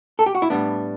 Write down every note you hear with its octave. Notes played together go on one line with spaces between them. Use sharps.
A4
G4
F#4
E4
A2 G3 B3 D4